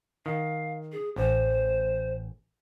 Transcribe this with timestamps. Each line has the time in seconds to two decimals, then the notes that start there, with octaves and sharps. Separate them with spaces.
0.26 D#3 F5
0.92 G#4
1.16 A1 C5